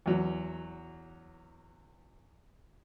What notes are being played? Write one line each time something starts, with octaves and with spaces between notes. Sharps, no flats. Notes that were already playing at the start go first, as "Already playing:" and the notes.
E2 F#3